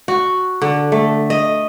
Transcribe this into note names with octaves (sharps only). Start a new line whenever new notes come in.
F#4
D3
A3
D#5